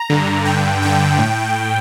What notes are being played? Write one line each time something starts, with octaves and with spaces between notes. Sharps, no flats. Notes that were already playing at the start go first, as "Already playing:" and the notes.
Already playing: A#5
G2 D3
G2 D3 G5
G2 D3 G5
A2